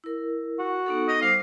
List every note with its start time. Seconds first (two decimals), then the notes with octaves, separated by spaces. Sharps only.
0.04 E4 A#4
0.59 F#4
0.86 B3 D#4 A4
1.08 D#5
1.21 G3 C5 F5 D6